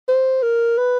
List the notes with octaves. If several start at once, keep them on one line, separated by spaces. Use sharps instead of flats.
C5
A#4
B4